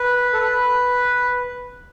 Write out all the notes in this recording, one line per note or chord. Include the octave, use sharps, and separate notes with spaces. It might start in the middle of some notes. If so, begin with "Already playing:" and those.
Already playing: B4
A4
B4